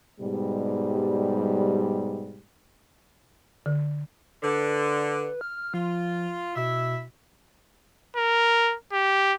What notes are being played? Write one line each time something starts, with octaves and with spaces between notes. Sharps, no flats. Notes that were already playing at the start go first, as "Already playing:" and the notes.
G#2 B2 G3
D3
D3 B4
F6
F3 F4
B2 E4 E5
A#4
G4